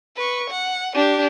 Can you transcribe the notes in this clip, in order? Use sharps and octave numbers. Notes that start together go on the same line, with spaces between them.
B4 C#6
F#5
D4 G4